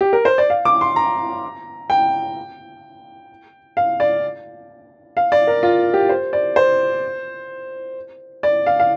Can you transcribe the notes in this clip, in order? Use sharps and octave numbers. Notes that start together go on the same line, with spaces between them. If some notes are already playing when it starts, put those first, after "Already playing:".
G4
A#4
C5
D5
F5
D6
C6
A#5
G5
F5
D5
F5
D5
A#4
F4
G4
C5
D5
C5
D5
F5
F5